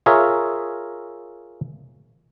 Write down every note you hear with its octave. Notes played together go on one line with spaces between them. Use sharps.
F4 G#4 A#4 C#5 E5